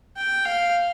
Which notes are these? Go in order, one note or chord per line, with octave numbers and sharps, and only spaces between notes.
G5
F5